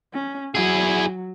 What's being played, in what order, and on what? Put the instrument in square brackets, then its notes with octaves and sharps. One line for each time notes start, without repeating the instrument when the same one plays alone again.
[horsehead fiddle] C#4
[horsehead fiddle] F#3 [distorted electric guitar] E4 G#4